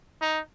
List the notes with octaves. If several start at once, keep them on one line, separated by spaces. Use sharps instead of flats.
D#4